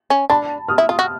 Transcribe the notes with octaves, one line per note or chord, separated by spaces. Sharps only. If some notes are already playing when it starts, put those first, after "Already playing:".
C#4
D4 A5 B5
D#6 F6
E4
F4
F#4